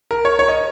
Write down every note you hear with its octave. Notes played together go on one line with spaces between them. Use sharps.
A#4
C#5
C#5
D#5